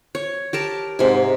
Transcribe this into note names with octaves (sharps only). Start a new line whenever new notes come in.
C#5
G4 A#4 A5
G#2 C3 G#5